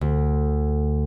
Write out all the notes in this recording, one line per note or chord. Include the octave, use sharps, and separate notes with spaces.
D2